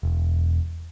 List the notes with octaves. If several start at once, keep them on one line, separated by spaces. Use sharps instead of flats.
E1